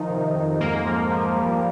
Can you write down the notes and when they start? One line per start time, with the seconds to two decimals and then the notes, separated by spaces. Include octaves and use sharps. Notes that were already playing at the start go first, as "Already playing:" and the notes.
Already playing: D#3 F3 D#4
0.10 C3
0.35 F2
0.60 G#2 A#3 A#4
0.85 F3
1.11 F3
1.36 G3